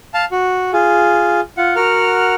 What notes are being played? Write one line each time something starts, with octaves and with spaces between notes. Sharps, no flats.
F5 A5
F#4
F4 G#4
F4 F#5
F#4 A#4 F#5 F6